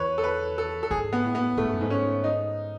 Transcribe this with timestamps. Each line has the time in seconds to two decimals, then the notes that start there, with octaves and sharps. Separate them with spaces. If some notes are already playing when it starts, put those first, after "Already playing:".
Already playing: E2 B4 C#5
0.18 A4
0.24 B4
0.58 A4
0.83 A4
0.91 G#2 G#4
1.13 B3
1.23 A2
1.35 B3
1.57 A2 A3
1.65 G#2
1.73 F#2
1.81 G#2
1.90 C#4
2.24 D#4